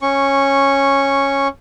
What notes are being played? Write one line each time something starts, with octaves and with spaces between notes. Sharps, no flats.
C#4 C#6